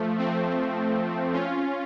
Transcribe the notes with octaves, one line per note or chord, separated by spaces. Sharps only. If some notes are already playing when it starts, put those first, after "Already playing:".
Already playing: F3 A3
A3 C4
C#4 F4